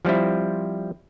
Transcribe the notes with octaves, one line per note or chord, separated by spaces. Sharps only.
F3 G3 C4 E4